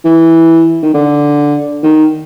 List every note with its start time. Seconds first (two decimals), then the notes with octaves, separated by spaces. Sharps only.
0.05 E3
0.83 D#3
0.94 D3
1.83 D#3